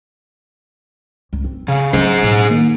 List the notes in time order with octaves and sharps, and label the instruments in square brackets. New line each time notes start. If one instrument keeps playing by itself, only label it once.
[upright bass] C#2
C4
[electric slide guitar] C#3 [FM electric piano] F5
[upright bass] D3 F#3 [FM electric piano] C#4 C7 [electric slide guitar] G#4 C5
[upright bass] A2
[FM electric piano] D#3 A#3